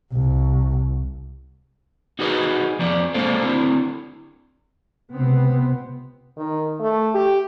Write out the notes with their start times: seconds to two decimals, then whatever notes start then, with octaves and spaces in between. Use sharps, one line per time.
0.12 C2
2.19 D#4 F#4 G#4 B4 D#5
2.79 F2 F3 D5
3.14 G#3 A#3 D4 A4 C5 F5
3.43 D3 C4 E4
5.12 C#2 C3 B3 C4
6.37 D#3
6.80 A3
7.14 G4